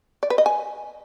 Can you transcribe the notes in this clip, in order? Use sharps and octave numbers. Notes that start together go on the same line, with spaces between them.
D5
B4
D#5
G#5